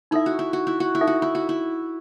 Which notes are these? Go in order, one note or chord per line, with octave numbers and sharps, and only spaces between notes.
D#4 E4 A4 E5
F#4
E4
F#4
E4
F#4
E4
D#4 A4 E5
F#4
E4
F#4
E4